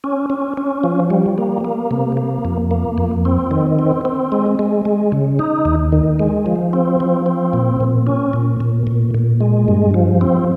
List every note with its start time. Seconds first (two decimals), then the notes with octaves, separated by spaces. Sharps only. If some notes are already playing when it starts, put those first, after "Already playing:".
0.04 C#4
0.30 C#4
0.57 C#4
0.84 F3
1.10 G3
1.38 A#3
1.65 A#3
1.91 C3
2.17 A#3
2.45 F2
2.71 A#3
2.98 F2
3.25 C4
3.51 D#3
3.79 C4
4.05 C4
4.32 G#3
4.59 G#3
4.85 G#3
5.12 C#3
5.39 D#4
5.65 D#2
5.92 D#3
6.19 G#3
6.46 F3
6.73 C4
7.00 F3
7.26 C4
7.53 A#2
7.80 A#2
8.07 C#4
8.33 A#2
8.60 A#2
8.87 A#2
9.15 A#2
9.40 G#3
9.68 G2
9.94 F3
10.21 C4